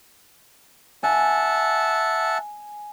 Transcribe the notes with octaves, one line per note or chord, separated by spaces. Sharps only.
E5 F#5 G#5 A5